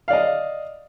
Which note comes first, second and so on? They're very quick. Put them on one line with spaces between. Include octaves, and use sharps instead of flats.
F5 D5 D#5